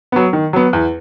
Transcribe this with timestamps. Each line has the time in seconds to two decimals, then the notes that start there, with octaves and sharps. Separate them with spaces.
0.12 F#3 B3
0.33 D#3
0.53 F#3 B3
0.73 E2